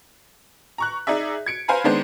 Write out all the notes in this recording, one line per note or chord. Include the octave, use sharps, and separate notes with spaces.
A#5 C#6 F#6
D#4 G#4 D5 E5
G#6 C#7 D7
B4 C5 F5 G#5 A#5 B5
D#3 G#3 B3 D4 C5